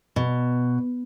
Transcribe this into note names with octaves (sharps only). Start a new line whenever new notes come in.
B2